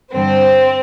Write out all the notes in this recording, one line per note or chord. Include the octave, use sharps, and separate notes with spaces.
G2 D3 G3 C4 C5